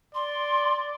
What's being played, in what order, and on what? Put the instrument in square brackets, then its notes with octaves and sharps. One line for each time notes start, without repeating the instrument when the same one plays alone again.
[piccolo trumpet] D5 [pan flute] C6